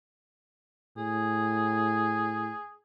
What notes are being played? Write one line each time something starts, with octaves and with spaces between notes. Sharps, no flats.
A2 G#4